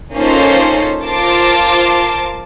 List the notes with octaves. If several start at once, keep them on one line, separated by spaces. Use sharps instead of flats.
A#3 C#4 D#4 F4 A4 C5
F4 A#4 C5 A5 D6